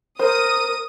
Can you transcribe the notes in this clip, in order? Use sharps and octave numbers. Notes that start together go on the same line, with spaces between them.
A#4 C5 D#6